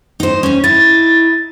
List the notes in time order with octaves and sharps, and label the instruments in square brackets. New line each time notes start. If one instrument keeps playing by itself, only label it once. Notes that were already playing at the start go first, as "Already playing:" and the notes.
[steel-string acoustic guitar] D#4 C5
C#4 D#4
[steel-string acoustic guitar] D#4 E4 [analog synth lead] A6